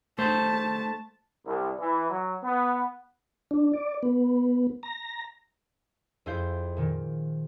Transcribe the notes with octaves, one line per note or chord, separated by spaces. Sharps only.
A3 C5 A5
C2
E3
F#3
B3
D4
D5
B3
A#5
F2 E4 G#4 C5 F5 G6
A#2 D#3